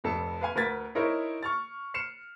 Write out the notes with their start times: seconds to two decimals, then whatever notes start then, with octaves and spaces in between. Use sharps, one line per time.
0.04 F1 F2 A4 A5
0.41 B4 F5 G#5
0.55 D2 A#4 B4 G#6 A6 B6
0.95 D#4 E4 A#4 C5 C#5
1.43 C#6 F6 A6
1.94 F6 C7 C#7 E7